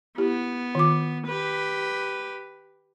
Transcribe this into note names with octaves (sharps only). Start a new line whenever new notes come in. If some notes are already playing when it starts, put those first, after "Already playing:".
B3 E4 G4
D#3 F4 D6
G4 B4